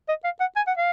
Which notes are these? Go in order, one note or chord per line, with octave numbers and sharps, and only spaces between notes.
D#5
F5
F#5
G#5
F#5
F5